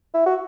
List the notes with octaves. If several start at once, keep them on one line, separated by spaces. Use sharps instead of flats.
E4
F#4